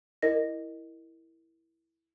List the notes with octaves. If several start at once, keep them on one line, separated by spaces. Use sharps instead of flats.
E4 A#4 D#5 A#6